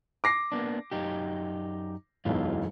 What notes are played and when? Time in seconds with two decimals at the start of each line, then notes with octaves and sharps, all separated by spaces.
0.24 D6 A#6 C7
0.52 A#3 B3 D4
0.91 F#2 D#4 G4
2.25 E1 B1 F#2 E3 F4